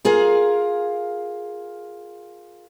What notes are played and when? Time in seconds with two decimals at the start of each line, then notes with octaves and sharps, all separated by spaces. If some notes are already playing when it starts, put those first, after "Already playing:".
0.05 F4 G#4 A#4 F5